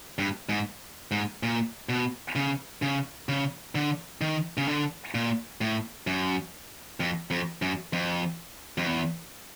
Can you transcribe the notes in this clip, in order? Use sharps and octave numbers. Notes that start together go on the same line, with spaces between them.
G2
G#2
G#2
A#2
B2
C#3
C#3
C#3
D3
D#3
C#3
D3
A#2
A2
F#2
F2
F2
F#2
F2
F2
E2